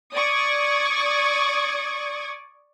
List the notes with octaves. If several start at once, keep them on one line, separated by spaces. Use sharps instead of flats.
D5 C#6 D#6 G#6